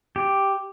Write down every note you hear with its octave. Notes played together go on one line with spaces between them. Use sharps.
G4